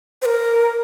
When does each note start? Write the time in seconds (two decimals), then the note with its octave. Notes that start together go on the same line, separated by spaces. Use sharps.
0.22 C5
0.25 A#4